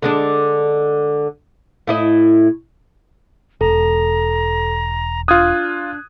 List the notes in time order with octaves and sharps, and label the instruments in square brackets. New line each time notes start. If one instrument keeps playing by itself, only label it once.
[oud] D3 G#3 D4
A2 E4 D#5
[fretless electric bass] E1 [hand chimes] A4 [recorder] A#5
[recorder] D4 [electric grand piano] F4 D#6 [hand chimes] F#6 G#6